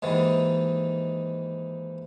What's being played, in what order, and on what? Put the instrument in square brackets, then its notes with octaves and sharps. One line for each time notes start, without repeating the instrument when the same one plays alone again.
[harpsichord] D#2 G#2 D#3 E3